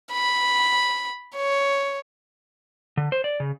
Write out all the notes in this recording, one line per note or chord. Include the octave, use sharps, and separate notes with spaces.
B5
C#5
D3
C5
D5
C#3